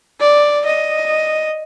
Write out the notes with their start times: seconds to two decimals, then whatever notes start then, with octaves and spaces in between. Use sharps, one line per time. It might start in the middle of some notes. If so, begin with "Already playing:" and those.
0.20 D5
0.66 D#5